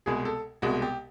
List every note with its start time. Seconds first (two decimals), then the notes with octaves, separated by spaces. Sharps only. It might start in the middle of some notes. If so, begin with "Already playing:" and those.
0.06 C2 B2 G#3 G#4
0.25 A4
0.62 C2 B2 G#3 F#4
0.82 G4